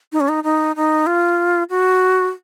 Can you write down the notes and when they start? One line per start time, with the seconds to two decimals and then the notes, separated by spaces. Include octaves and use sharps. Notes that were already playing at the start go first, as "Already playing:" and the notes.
0.12 D#4
0.20 C#4
0.28 D#4
0.44 D#4
0.76 D#4
1.06 F4
1.70 F#4